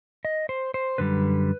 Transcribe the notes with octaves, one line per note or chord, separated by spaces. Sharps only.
D#5
C5
C5
F#2 D3 G3 B4